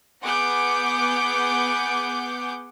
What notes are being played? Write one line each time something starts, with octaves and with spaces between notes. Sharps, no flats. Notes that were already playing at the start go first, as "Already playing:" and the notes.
B3 G#4 F#5 D6 G6